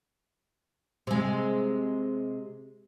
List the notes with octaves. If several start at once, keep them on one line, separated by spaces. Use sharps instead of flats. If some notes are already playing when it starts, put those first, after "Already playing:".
C3 G#3